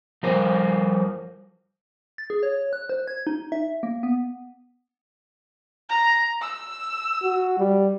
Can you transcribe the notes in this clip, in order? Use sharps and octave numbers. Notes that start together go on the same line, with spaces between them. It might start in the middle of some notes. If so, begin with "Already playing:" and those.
F3 G3 A#4 C5
A6
G#4
C#5
F#6
C5
G#6
D#4
E5
A#3
B3
A#5
E6
F#4
G3